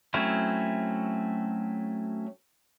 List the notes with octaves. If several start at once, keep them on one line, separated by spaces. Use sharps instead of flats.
F#3 A3 C4 C#4 E4